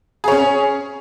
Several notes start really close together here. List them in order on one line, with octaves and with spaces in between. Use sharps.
G#4 C#5 C#4